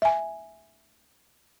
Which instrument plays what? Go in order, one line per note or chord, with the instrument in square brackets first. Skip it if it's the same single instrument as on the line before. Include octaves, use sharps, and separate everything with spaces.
[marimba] E5 G#5